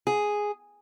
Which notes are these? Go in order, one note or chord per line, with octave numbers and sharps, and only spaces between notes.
G#4